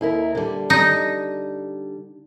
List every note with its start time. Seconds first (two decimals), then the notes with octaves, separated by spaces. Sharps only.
0.01 D#2 E4 A#4
0.35 D3 G3
0.70 D#4